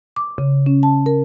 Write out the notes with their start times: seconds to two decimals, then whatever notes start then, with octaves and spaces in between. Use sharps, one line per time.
0.16 D6
0.38 C#3
0.66 C#4
0.83 A5
1.06 A#4